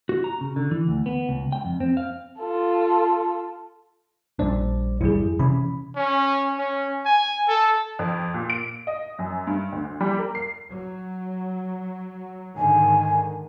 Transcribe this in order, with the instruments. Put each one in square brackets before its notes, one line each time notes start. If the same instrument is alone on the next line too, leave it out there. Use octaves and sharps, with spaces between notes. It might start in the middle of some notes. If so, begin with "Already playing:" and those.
[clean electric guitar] F#4
A#5
C#3
D3
E3
D2
B3
C#2
G5
F2
C4
F5
[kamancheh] F4 A4
[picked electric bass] A#1 A#2 D4 [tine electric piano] G3 C5 D5
[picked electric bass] G#1 F2 G3 [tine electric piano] E4 G#4
[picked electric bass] C3 E3 C#4 [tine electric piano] B5
[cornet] C#4
C#4
G#5
A4
[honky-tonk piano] F2
A#2
D7
D#5
F#2
G2
D2
G3
A#4
C7
[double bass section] F#3
[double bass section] G#2 D3 D#3 [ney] G#5